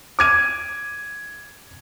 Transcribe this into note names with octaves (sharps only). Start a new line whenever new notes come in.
D6 G#6 D#7